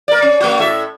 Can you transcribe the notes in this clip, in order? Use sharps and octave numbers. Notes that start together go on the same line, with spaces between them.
A#4 D5
C#4
A3 F#4
A2 A4 E5